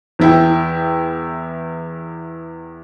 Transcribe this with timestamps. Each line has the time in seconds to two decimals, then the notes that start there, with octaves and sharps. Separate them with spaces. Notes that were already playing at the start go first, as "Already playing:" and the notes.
0.19 E2 E4 G5